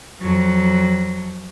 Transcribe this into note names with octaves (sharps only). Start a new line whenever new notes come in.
F2 F#3